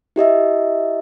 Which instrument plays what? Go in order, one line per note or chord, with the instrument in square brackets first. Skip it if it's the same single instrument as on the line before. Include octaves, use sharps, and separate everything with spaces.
[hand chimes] E4 G4 D#5 E5